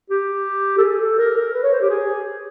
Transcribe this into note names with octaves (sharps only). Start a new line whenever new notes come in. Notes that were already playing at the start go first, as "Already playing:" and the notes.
G4
A4
G#4
A4
A#4
A#4
B4
C#5
C5
G4
G#4